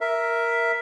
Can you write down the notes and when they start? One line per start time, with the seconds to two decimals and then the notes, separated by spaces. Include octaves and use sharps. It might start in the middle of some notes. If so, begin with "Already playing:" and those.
0.01 A#4 E5